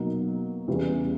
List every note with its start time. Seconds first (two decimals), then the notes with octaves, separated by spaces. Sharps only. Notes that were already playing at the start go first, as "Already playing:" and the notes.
Already playing: B2 F#3 A#3 D#4
0.68 E2 C#3 E3 G3